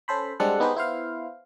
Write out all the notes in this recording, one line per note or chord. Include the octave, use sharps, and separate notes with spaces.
C#4 A4 C5 B5
G3 G#3 C4 D4 A4 F#5
B3 D#4 G4 G#4 B4 C5
B3 E4 C5 F5